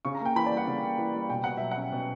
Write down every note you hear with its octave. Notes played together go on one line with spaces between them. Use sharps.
C#3 C#6
A#5
A#3 G5
E3 B5
D5
G3
F#5
C#3
A#3
E3
G3
B2 G5
B2 F#5
F#3 E5
F#5
C#4
B2